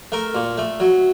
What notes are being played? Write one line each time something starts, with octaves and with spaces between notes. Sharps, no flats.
A3 A#4
A#2
A3
F#3